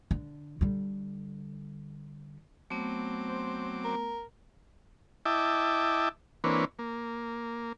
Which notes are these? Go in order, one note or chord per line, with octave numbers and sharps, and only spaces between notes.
D3
D3 G3
F#3 A3 B3 C4 D6
C5
A#4
E4 D#5 E5 G5 A5 D6
E3 A#3 C4 D4 B4 C#5
A#3